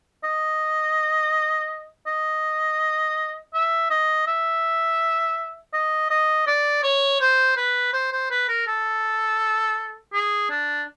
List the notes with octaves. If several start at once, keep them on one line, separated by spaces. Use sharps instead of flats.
D#5
D#5
E5
D#5
E5
D#5
D#5
D5
C#5
C5
B4
C5
C5
B4
A#4
A4
G#4
D4